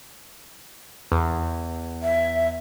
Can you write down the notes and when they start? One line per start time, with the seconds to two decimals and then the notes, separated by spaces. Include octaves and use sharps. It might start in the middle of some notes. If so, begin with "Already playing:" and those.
1.12 E2
2.03 E5